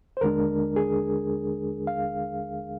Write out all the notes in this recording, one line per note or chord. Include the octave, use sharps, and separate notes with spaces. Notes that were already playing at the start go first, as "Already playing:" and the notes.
C5
D#2 D3 G#3 D4 A#4
G#4
F5